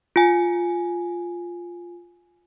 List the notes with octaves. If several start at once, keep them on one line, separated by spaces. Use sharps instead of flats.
F4 G#5